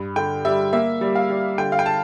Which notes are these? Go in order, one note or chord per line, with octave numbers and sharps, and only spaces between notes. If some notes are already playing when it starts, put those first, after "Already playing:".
Already playing: G2
D3 G5
G3 E5
A#3 E5
G3
F5
G3
D3 G5
F5
G5
A5